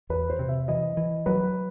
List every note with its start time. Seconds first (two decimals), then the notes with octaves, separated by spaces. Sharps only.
0.09 E2 B4
0.30 C5
0.39 C3
0.49 E5
0.68 E3 D#5
0.97 E3
1.26 F#3 B4